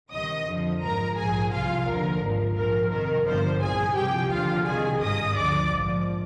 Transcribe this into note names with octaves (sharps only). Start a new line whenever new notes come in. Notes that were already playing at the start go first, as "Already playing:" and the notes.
C2 C3 D#3 D#5 D#6
F2 D3 F3
G#1 G#2 F3 A#4 A#5
A#1 G#2 F3 G#4 G#5
C2 C3 F3 F4 F5
D#2 D3 F3 A#4
G#1 G#2 F3
A#1 G#2 F3 A#4
F2 C3 D#3 A#4
G1 G2 D3 F3 C5
C2 A#2 F3 G#4 G#5
C2 C3 F3 G4 G5
D#2 D3 F3 F4 F5
C2 C3 D#3 G#4 G#5
G#1 G2 D#3 D#5 D#6
D2 D3 F3 D5 D6
A#1 G#2 F3